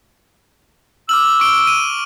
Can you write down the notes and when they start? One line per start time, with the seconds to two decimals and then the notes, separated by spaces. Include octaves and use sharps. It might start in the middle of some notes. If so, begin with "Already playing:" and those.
1.09 D6 E6 F6 F#7
1.40 C#6 D7 G7
1.67 D#7